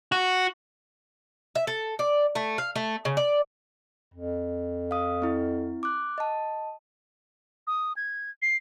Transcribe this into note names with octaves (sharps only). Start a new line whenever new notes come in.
F#4
E5
A4
D5
A3
F5
A3
C#3
D5
F2
F5 D#6
C4 E4
D6 F#6
D#5 A5
D#6
G#6
C7